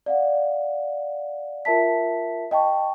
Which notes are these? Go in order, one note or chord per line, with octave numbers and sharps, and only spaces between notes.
D5 F5 F#5
F4 A#4 E5 A5 B6
D#5 G5 A5 C#6